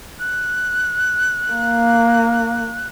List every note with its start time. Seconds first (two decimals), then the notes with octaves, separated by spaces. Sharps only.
0.20 F#6
1.52 A#3